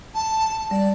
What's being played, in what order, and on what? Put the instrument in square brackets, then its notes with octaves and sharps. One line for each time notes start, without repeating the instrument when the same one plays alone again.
[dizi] A5
[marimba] G3 [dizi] D5